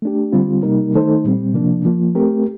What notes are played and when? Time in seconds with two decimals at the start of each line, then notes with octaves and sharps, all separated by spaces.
0.02 A3 D4 G4
0.32 D3 G3 C4 F4
0.63 C3 G3 A#3 D#4 A#4
0.94 D#3 A3 D#4 A4 C5
1.24 A#2 G3 C4
1.54 C3 F3 A#3 D4
1.85 F3 A#3 F4
2.15 A3 C4 G4 A#4